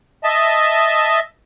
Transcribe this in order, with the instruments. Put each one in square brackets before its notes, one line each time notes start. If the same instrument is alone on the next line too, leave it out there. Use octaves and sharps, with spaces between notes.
[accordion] D#5 E5 A5